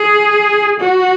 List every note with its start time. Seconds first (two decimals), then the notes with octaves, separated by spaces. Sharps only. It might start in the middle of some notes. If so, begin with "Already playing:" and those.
Already playing: G#4
0.80 F#4